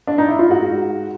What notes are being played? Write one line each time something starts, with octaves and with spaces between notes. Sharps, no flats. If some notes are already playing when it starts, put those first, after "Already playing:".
D4
D#4
E4
F4
G#2 F#4